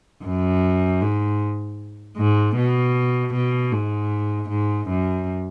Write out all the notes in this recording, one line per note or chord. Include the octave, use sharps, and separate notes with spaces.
F#2
G#2
G#2
B2
B2
G#2
G#2
F#2